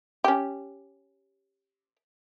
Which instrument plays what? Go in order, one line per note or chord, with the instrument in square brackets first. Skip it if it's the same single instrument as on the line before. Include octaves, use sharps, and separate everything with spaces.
[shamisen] C#4 G4